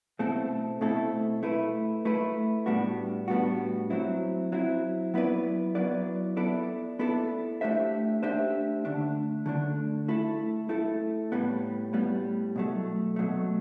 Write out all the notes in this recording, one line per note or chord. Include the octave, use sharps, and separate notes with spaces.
B2 A3 C4 E4 A4
B2 A3 C4 E4 A4
A3 E4 B4
A3 E4 B4
A2 G3 B3 D4 F#4
A2 G3 B3 D4 F#4
F#3 C4 E4
F#3 C4 E4
F#3 B3 E4 B4 D5
F#3 B3 E4 B4 D5
B3 E4 A4 D5
B3 E4 A4 D5
A3 D4 G4 C5 E5
A3 D4 G4 C5 E5
D3 A3 D4
D3 A3 D4
A3 E4 A4
A3 E4 A4
A2 G3 B3
A2 G3 B3
B2 F#3 A3
B2 F#3 A3